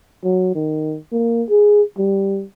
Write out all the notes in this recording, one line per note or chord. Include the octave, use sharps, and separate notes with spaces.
F#3
D#3
A#3
G#4
G3